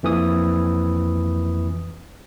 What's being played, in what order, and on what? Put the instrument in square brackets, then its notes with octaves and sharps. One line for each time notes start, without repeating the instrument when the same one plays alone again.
[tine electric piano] F2 E3 A#3 D#6